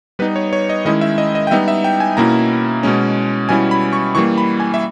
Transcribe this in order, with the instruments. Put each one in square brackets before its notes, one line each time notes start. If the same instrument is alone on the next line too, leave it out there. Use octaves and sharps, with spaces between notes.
[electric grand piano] G3 B3 D#4 B4
C#5
C#5
D#5
D#3 G#3 C#4 E4 D#5
E5
D#5
D#5
G5
G3 B3 D#4 E5
E5
G5
G#5
B2 A#3 C#4 E4 A#5
B2 G#3 C#4
B2 G3 C#4 E4 G#5
B5
C#6
E3 G3 A#3 C#6
B5
G#5
E5